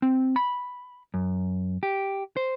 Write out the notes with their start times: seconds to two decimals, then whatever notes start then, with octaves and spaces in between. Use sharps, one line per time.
0.02 C4
0.36 B5
1.14 F#2
1.83 G4
2.37 C5